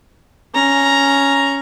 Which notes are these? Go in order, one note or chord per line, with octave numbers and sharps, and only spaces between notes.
C#4 A#5